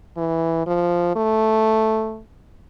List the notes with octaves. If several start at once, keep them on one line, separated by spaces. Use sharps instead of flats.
E3
F3
A3